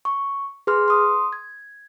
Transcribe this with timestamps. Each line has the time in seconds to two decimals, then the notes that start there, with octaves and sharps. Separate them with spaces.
0.05 C#6
0.67 G#4 B4 C6 F6
0.88 C6 D#6
1.33 G#6